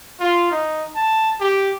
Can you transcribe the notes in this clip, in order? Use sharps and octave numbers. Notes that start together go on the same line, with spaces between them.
F4
D#4
A5
G4